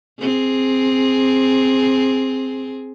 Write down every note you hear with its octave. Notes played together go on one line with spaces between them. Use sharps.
C4 G#4